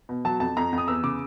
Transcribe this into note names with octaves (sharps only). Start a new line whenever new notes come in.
B2
F#3 A5
F2 A5
F2 A#5
F2
D#6
E2 E6
C#3 D6